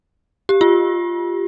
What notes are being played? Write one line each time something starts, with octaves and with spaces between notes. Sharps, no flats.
G4
F4